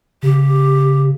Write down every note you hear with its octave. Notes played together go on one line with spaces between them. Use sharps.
C#3 G4